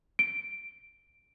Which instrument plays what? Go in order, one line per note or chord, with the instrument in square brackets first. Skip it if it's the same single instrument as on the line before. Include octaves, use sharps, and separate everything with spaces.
[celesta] D7